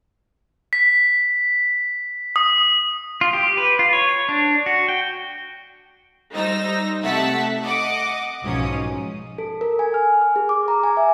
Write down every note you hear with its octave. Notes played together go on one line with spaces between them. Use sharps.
B6
D#6
F4
G4
B4
F4
C#5
D4
F#4
G5
G3 D#4 C5 E6 A#6
C3 A3 E5 F#5 A5 B6
D#5 F#5 D6
B1 G#2 F3 C#4 D#6
A4
A#4
G#5
F6
F6
G#4
D6
A#5
G#5
E5